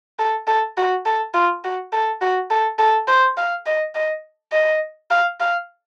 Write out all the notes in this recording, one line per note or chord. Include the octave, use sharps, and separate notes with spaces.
A4
A4
F#4
A4
F4
F#4
A4
F#4
A4
A4
C5
F5
D#5
D#5
D#5
F5
F5